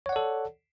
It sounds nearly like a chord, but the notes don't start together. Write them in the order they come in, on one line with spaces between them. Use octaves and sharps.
C#5 F#5 D5 A4